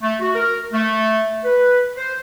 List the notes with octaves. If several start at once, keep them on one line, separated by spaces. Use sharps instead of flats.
A3
F#4
A#4
A3
B4
C5